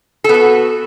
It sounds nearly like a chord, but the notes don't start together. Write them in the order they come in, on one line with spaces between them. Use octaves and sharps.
A4 B3 F#4